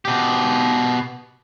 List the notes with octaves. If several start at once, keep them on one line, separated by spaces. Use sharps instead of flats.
B2 G4